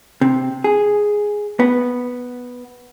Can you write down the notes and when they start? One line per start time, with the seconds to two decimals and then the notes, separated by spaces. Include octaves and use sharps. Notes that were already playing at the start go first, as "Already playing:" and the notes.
0.21 C3
0.64 G#4
1.60 B3